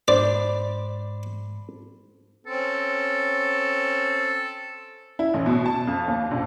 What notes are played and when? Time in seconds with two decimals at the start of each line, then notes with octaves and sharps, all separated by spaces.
0.08 G#2 D4 C5 D5 B5
2.47 C4 C#4 A4
5.19 E4
5.34 A1
5.46 B2
5.66 A5
5.87 F2
6.08 D#2
6.31 A#1